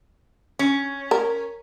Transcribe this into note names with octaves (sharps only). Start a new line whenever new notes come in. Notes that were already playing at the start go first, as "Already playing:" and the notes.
C#4
A#4